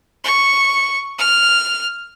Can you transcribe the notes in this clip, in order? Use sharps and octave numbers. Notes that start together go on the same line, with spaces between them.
C#6
F6